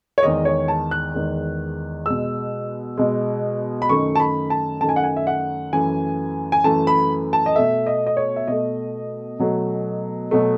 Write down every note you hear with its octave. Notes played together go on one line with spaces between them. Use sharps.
C#5
E2 D#3 G#3 D#5
C#5
A5
F#6
E2 D#3 G#3
B2 G#3 E6
B2 G#3
B5
F#2 D#3 A3 C#6
A5
B5
A5
F#2 D#3 A3 A5
G#5
F#5
G#5
E5
F#5
F#2 E3 A3 G#5
G#5
F#2 E3 A3 A5
B5
A5
D#5
B2 A3 E5
D#5
D#5
C#5
E5
B2 A3 D#5
B2 F#3 A3
B2 F#3 A3